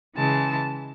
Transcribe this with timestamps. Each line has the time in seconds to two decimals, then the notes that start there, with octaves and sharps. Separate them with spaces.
0.16 C#3 E3 G#3 A5